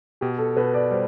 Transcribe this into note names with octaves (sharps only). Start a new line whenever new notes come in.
B2 G4
A4
B2 B4
D5
G3 C5